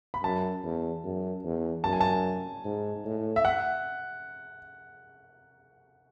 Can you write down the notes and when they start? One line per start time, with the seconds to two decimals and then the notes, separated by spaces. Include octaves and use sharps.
0.14 B5
0.23 F#2 A5
0.64 E2
1.04 F#2
1.45 E2
1.84 F#2 A5
1.93 G#5
2.01 A5
2.64 G#2
3.05 A2
3.36 E5
3.45 F#5